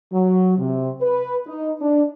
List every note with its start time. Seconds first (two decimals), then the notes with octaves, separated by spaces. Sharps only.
0.13 F#3
0.59 C3
1.01 B4
1.47 D#4
1.81 D4